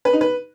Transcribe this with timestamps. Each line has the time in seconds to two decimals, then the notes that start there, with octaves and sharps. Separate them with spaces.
0.05 B4
0.13 D#4
0.21 B4